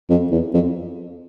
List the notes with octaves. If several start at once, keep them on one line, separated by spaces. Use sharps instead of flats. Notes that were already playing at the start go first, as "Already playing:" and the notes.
F2
E2
F2